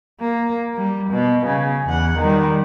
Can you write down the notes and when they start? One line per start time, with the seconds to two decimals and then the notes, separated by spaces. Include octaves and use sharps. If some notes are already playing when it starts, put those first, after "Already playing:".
0.21 A#3
0.77 G3
1.10 B2
1.47 C#3
1.87 E2 F#5
2.18 D#3 G3